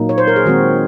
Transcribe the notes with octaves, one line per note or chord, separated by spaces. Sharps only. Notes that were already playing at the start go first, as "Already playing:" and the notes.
Already playing: A#2 F#3 A#3 D#4
C#5
C5
A#4
G#4
D#3 G#3 C4 F#4